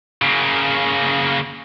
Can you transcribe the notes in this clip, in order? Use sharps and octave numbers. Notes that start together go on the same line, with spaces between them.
C#3 A#3